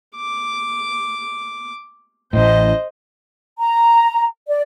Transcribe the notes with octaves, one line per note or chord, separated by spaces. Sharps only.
D6
A1 A2 C5 D#5
A#5
D5